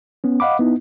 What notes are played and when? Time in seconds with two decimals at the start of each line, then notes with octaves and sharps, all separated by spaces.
0.24 B3 C#4
0.40 D#5 F5 F#5 B5 D6
0.59 B3 D#4 E4